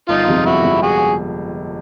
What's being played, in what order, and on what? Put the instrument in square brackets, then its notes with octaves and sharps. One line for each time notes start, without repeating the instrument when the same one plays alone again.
[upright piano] G1 [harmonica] D#4 F4
[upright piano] F2 C3 F3 G#3
[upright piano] G1 [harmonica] E4 F#4
[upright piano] F2 C3 F3 G#3
[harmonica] F#4 G#4